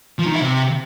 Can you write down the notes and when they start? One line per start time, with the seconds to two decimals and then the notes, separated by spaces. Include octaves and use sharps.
0.19 F3
0.26 D#3
0.34 E4
0.42 C3